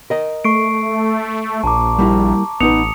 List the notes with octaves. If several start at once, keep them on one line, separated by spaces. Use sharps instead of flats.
A#4 D#5
A3 C#6 C7 D7
A#1 A5 A#5 D6
G3 A#3 E4
A1 B3 D#4 B4 D#6 C#7 F7